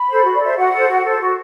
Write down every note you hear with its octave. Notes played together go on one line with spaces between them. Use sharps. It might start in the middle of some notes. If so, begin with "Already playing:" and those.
Already playing: B5
A4 C5
F#4
D5
A4 C5 E5
F#4 F#5
A4 C5
F#4
A4 C5
F#4